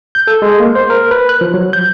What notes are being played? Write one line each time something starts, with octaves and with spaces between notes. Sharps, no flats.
G6
A4
G#3
A#3
C5
A#4
B4
F#6
F3
F#3
G6